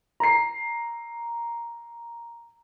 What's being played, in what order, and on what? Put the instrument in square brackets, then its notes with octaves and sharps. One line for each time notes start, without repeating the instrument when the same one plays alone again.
[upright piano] A#5 C7